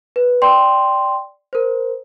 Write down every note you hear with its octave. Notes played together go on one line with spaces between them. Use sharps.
B4
D5 G5 C6
A#4 C5